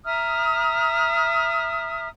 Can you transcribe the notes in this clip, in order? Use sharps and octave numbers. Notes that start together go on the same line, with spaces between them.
E5 A#5 D#6 F6